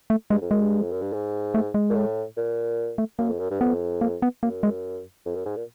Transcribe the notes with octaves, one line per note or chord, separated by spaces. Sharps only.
A3
G2 G#3
F2
F#2 G#3
G2
F2
F#2
G2
G#2
A3
G#3
A#2
A2
A#2
A3
F#2 A#3
F2
F#2
G2
F2 B3
A#3
B3
F#2 A#3
G#3
F2
F#2
G#2
A#2